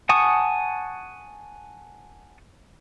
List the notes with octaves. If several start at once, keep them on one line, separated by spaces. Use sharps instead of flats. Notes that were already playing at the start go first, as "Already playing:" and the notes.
F#5 G#5 A5 C#6 D#6